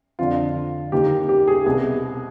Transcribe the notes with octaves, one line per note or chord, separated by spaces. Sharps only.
F2 D3 F4
D#2 D#3 G4
G4
G#4
C2 B2 G#4